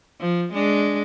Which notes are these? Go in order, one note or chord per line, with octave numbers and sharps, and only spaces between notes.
F3
G#3 D4